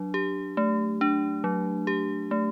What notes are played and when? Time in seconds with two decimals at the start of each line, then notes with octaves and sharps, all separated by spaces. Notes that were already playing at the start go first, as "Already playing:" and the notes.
Already playing: F#3 D4
0.14 G4
0.57 A3
1.01 D4
1.44 F#3
1.87 G4
2.31 A3